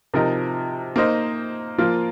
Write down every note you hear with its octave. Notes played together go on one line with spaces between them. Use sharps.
C3 F3 D#4 A#4 D#5
A#3 D#4 C5 D#5
F3 A#3 F4 A#4